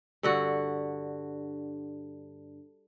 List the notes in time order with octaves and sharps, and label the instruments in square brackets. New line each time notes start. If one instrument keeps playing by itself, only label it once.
[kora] G2 D3 F#4